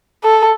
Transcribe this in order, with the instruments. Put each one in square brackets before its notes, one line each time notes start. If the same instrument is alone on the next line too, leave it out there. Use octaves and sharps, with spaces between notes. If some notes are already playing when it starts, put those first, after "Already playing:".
[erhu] A4